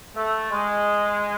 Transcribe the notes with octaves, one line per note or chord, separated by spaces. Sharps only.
A3
G#3